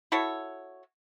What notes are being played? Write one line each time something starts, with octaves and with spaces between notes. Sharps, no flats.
E4 F#4 A4 C#5